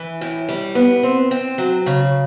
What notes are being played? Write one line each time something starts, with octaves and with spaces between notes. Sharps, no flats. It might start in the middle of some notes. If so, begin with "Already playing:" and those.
Already playing: E3
A2
G3
B3
C4
C4
F#3
C#3